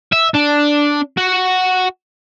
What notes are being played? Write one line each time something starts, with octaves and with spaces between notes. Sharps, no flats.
E5
D4
F#4